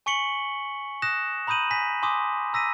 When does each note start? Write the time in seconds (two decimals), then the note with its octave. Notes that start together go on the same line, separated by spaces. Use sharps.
0.06 G#5 C#6 B6 C#7 F#7 G7
1.02 D#6 F#6 A#6 E7
1.47 A#5 B5 D#6 G6 D#7 F#7
1.71 G#5 A#6 B6
2.03 G#5 C6 D6 D#6
2.53 A#5 E6 A#6 B6 D#7